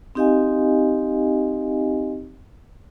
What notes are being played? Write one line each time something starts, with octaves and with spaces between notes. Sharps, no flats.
C4 D#4 G4 D#5 F5 G#5